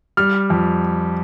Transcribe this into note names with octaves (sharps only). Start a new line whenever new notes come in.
G3 F6
F2